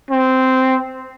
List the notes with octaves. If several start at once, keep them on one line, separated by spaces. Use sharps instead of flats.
C4